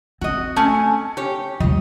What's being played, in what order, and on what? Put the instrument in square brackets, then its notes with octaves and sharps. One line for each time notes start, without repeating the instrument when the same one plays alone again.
[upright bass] C4 [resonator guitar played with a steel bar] F#4 D#5
[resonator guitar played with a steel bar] A3 C#4 G#5
G4 C#5
[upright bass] D#2 G3 [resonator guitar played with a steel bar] D#5